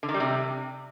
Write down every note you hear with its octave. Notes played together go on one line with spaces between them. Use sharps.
D3
D#3
G3
C3